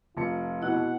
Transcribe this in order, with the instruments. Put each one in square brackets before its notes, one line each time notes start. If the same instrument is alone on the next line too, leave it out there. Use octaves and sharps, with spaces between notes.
[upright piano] F1 A5 C#7 [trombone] F4
[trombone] B2 [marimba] E4 D#5 [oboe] F#5